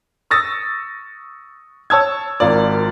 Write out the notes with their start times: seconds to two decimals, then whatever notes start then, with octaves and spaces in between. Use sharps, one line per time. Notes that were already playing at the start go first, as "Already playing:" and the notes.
0.31 C#6 D#6 E6 A6 A#6
1.90 C#5 A5 E6 G#6
2.40 G#1 F4 A#4 D5